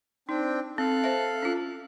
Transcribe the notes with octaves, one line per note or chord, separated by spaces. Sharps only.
C4 D4 D#4 G5
C4 A4 F5 F#6
C5 E5
C#4 F4